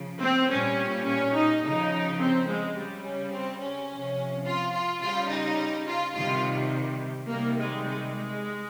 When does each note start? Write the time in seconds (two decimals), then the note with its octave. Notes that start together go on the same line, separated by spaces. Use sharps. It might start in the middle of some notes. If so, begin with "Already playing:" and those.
Already playing: C#3 F3
0.22 C4
0.50 A#2 G3 C#4
1.07 C#4
1.34 D#4
1.63 C#3 F3 D#4
2.19 C4
2.48 G#3
2.76 C#3 G3
3.04 C#4
3.32 C4
3.60 C#4
3.89 C3 F3
4.45 F4
4.73 F4
5.02 C#3 G3 F4
5.30 D#4
5.87 F4
6.15 C3 D#3 G3 F4
7.28 C3 D#3 G3 A#3
7.56 G#3
7.85 G#3
8.13 G#3